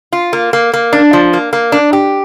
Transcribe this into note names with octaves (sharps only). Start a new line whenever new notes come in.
F4
A#3
A#3
A#3
D4
F3
A#3
A#3
D4
G4